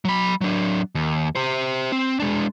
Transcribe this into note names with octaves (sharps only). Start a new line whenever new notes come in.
F#3 B5
F#3 D4
D#2
G4 C5
C4
G#3 D4